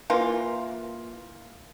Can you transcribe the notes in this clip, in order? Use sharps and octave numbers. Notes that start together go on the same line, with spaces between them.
E3 A#3 F4